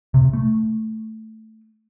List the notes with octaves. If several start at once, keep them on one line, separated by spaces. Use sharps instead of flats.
C3
A3